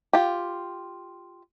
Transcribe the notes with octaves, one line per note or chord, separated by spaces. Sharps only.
F4 G4